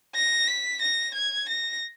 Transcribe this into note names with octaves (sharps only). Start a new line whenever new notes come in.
A#6
B6
A#6
G#6
A#6